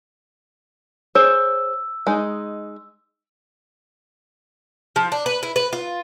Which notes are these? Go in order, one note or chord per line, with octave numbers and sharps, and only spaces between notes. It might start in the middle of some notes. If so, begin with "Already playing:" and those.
G#4 C5 C#5 E6
G#3 D#4
F3
D4
B4
E4
B4
F4